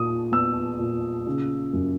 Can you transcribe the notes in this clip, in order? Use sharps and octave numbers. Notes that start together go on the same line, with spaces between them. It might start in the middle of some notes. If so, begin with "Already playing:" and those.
Already playing: A#2 D#6
B3 E6
A#2
C#3
F#2